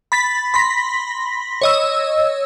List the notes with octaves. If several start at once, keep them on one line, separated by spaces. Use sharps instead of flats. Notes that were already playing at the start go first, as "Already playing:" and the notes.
B5 A6 B6
B5 C6 A#6 B6
C#5 D#5 E6